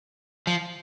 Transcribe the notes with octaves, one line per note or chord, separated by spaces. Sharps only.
F3